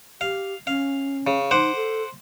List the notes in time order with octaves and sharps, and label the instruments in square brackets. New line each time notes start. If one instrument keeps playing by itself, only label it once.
[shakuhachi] G4 [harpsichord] F5
[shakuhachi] C#4 [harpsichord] F5
[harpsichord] C#3
[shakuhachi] D#4 [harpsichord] C5 F#5 D6
[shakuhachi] A4